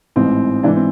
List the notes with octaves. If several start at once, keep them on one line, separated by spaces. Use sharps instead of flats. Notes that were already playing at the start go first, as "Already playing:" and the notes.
A1 G#2 E3 C4
G#2 E3 D4
C4